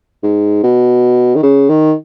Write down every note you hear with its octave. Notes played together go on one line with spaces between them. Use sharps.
G#2
B2
D#3
C#3
D#3